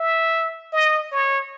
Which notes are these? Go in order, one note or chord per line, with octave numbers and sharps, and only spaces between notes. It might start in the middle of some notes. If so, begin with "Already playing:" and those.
Already playing: E5
D#5
C#5